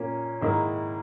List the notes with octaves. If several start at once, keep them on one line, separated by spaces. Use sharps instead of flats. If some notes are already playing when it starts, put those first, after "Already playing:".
Already playing: A#2 A#3 C#4
G#2 D#3 A#3 E4